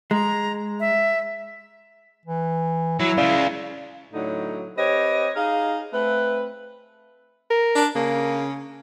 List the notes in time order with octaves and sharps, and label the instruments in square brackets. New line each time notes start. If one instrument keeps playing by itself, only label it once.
[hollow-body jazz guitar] G#3 [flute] A#5
[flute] E5
[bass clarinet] E3
[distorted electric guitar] F#3 [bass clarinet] E4
[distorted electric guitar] C#3 G#3 [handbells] D5 F5
[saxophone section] A2 D3 F#3 D#4
C4 G4 B4 C#5 D#5
D#4 G#4 F5
A3 C4 B4
[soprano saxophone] A#4
[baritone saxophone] D4
[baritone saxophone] C#3 [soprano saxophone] A#3